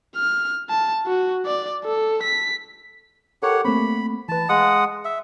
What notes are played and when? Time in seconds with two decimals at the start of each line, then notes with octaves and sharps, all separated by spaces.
0.16 F6
0.70 A5
1.07 F#4
1.45 D5
1.85 A4
2.23 B6
3.43 G4 A4 A#4 C#5 F#5 C#7
3.65 A3 A#3 C4 B5
4.29 E3 B4 A5
4.49 G#3 F5 F#5 D#6
5.05 E5